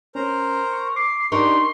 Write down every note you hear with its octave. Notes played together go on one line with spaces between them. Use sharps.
C#4 A#4 C5 A#5
C#6
D6 C7
D4 D#4 G4 A#4 G5 C6 C#6